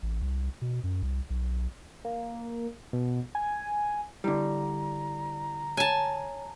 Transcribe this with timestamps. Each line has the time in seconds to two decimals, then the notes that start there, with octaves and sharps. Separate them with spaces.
0.03 A1
0.22 C2
0.62 B2
0.84 F#2
1.02 C2
1.30 B1
2.05 A#3
2.93 B2
3.35 G#5
4.24 D3 G3 E4 D5 A#5
5.77 C#5 G#5 A5